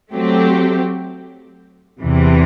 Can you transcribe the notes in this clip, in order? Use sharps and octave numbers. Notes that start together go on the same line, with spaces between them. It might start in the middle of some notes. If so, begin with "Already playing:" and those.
F#3 A3 C4 G4
E2 C3 E3